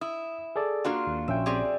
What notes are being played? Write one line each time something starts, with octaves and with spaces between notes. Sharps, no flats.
E4 D#6
G#4 A4 D5
A#3 D4 F4 F#4 C6
D#2
A#1 C#4 E5 G5
C4 G4 G#4 D5